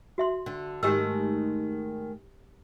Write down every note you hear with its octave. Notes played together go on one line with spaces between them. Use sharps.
F#4 E5 C6
D3
G#2 D#3 A3 G4 D#5 E6